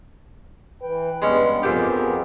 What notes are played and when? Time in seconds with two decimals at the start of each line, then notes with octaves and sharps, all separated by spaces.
0.82 E3 B4 G5
1.22 G2 G3 G#3 B3 C#4
1.63 F2 B3 G4 G#4 A#4